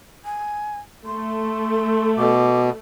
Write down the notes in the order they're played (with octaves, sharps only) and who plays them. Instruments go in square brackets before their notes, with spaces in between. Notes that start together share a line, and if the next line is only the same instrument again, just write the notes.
[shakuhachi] G#5
[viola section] A3 [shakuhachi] C6
[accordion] B2 [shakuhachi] D6